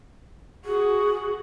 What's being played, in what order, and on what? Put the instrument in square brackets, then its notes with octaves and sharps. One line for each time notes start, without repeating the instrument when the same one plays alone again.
[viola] F#4 [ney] G#4